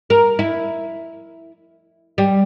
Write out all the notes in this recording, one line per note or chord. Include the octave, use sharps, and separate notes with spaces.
A#4
E4
G3